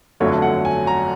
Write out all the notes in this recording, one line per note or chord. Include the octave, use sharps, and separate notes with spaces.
G1 F2 D3 F#3 A3 C#5
F#5
G#5
A#5